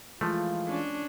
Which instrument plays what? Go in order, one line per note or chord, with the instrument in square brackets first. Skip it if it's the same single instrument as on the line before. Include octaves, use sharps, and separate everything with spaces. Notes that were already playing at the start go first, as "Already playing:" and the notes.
[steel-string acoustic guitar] E3 G#3 [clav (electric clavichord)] F3 A3 [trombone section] F4
[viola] C#4 D4